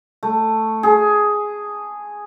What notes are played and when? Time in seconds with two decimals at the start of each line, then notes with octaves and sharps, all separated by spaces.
0.23 A3
0.83 G#4